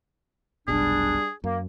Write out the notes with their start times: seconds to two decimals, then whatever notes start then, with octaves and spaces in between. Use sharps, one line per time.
0.68 F1 B1 B2 G3 D4 G#4
1.44 F#2 A#3